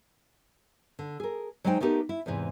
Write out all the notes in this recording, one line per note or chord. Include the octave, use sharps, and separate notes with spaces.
D3
G#4 A#4
F#3 G#3 D#4 C5 G5
A3 B3 D#4 G4 A#4
E4
E2 G#2 C3 E3